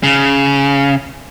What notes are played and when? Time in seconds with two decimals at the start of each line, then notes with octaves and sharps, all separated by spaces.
0.03 C#3